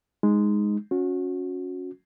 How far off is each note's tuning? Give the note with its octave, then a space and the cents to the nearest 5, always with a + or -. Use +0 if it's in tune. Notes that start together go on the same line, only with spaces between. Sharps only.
G#3 +0 D#4 +0
C#4 +0 F#4 -25